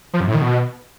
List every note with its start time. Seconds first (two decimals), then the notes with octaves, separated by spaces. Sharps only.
0.14 F3
0.21 F#2
0.28 A2
0.35 D#3
0.42 B2